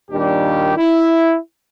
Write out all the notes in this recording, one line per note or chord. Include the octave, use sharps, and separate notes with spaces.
D#2 A#2 D#3 G3 D4 G4
E4